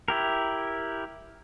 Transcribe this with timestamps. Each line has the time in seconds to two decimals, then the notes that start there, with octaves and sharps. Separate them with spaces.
0.08 E4 G4 A#4